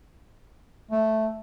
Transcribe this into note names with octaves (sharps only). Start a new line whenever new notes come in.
A3